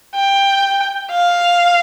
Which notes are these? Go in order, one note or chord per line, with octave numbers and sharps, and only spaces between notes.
G5
F5